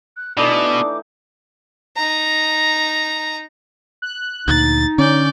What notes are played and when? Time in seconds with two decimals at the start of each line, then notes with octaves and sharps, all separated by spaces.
0.17 F#6
0.38 B2 E3 A3 D4 D#4 D6
1.97 D#4 A#5
4.02 F#6
4.48 D2 A#2 D#4 A6
4.98 D3 C#4 D5 G6